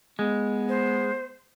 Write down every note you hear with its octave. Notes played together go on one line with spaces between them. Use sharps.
G#3 B3
C5